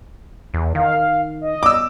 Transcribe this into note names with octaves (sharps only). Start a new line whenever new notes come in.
E2
D#3 F5
D#5
D6 E6